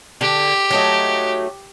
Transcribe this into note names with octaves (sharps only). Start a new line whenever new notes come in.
D3 G4
F#3 A3 D#4